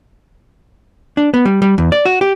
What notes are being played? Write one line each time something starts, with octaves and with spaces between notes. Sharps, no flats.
D4
B3
G3
G3
E2
D5
F#4
G4